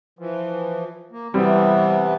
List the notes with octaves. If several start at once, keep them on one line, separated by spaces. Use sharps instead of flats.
E3 F3
A#3
C3 E3 G3 B3 C4